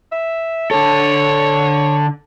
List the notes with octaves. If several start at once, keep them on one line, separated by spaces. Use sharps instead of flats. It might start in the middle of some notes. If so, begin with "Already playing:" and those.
E5
D3 A4 C#5